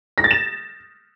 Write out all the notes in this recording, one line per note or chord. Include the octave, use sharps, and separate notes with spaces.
A#6
A6
E7